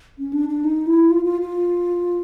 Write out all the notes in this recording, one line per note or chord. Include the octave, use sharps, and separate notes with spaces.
C#4
D4
D4
D#4
E4
F4
F4
F4